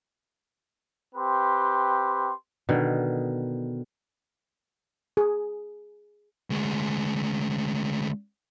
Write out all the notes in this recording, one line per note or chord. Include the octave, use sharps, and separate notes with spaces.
C4 G4 B4 C6
B2 D3 D#3
G#4
D2 G#3